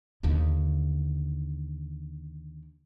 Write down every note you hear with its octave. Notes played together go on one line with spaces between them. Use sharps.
D#2 D3